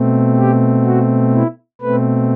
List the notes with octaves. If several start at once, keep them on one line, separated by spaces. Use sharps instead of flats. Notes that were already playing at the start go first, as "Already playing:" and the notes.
Already playing: B2 A3 C4
G4
F#4
E4
B2 A3 C4 B4